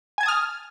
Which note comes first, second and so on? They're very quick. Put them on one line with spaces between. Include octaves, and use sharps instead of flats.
G#5 G#6 A5 D#6 F6